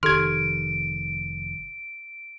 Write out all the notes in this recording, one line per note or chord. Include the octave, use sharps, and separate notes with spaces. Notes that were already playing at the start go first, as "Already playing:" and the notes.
F1 D#3 G4 A4 C6 F6 G#6 D7